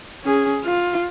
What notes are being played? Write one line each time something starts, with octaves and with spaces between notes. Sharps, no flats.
C#4 G#4
F4